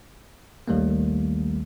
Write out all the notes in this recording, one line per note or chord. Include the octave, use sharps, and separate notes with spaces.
A#1 D#2 D#3 G3 A3 A#3